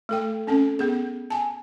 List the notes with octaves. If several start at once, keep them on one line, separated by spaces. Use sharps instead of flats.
A3 A4 G5
C4 C#4 A4
B3 G#4
G#5 A5